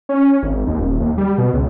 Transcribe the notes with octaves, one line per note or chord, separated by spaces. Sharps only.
C#4
G#1
D#2
D#1
D#2
G3
B2
C#2